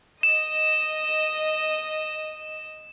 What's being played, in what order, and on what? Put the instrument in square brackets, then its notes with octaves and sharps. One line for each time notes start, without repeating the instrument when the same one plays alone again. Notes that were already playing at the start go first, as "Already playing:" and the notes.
[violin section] D#5 [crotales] E7